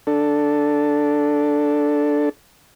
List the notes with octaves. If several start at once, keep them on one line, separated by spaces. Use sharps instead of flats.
D4 A4